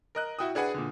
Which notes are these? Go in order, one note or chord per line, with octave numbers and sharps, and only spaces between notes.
A#4 D#5 F#6
E4 F#4 G5 D#6
D4 G#4 B4 F#5 G#5
A#2 D3